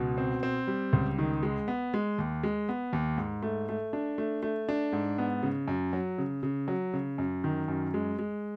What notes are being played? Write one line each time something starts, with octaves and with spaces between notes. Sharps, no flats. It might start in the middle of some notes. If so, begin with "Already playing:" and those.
Already playing: C#2 B2
C4
C4
G3
C#2
D#3
G#3
B3
G#3
D#2
G#3
B3
D#2
G#2
A3
A3
D4
A3
A3
D4
G#2
B3
C#3
F#2
F#3
C#3
C#3
F#3
C#3
F#2
D#3
F#2
G#3
G#3